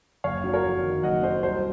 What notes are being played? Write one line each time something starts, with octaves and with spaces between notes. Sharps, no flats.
F#1 C#5 F5
F#3
A#4 C#5
F2
D#3
F#1 D#5 F#5
F#3 C5 D#5
C2 C5